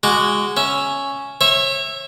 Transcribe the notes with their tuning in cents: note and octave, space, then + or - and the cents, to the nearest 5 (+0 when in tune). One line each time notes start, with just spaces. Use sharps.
G#3 -10 F#4 +0 D6 -5
C#4 +0 E5 +5
C#5 -30 E5 +0